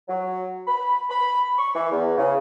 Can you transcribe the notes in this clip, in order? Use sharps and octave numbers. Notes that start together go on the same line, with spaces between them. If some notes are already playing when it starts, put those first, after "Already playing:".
F#3
B5
B5
C#6
E3
E2
C#3